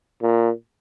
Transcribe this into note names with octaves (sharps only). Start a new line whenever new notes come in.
A#2